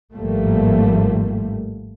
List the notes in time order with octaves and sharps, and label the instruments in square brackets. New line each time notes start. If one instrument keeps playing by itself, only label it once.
[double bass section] G#1 A2 F3 G3 A3 A#3